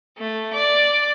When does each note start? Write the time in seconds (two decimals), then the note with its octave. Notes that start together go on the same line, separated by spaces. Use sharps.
0.17 A3
0.53 D5